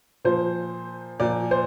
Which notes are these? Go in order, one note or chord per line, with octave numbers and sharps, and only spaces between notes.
A#2 F3 C5
A#2 F3 D5
C5